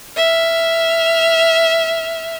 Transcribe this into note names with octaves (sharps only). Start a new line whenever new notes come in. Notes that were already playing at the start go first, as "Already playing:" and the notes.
E5 F6